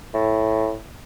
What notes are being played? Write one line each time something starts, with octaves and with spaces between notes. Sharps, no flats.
A2